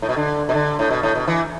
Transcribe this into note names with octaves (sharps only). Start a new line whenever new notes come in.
A2
B2
D3
B2
D3
A2
B2
A2
B2
E3